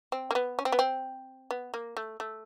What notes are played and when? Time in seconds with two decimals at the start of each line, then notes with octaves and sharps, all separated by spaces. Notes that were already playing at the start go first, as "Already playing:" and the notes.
0.12 C4
0.31 A#3
0.35 B3
0.59 C#4
0.65 C4
0.72 B3
0.79 C4
1.51 B3
1.74 A#3
1.97 A3
2.20 A3